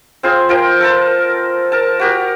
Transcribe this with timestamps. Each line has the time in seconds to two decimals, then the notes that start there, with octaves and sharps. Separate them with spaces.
0.23 C4 F4 G#4 C6
0.49 F3 A#4 G5
0.80 A4 A#4 A5
1.72 A#4 A5
1.99 F#4 G4 A#4